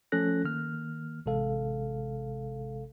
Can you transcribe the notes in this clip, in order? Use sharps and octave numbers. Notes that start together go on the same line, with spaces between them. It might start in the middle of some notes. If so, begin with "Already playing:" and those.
F3 A3 C#4 A4 F#6 A#6
D#3 A#3 F6
A1 C3 G#3 A4 F5